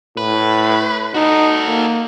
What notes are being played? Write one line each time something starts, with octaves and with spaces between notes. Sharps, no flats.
A2 B4
D#4 F#4 A4
A#3